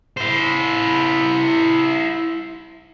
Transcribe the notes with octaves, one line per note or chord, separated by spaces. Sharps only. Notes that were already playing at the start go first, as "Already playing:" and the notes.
E4 C5